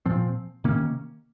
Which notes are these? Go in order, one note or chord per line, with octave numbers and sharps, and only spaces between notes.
A#2 F3 C4
C3 D#3 A#3 C#4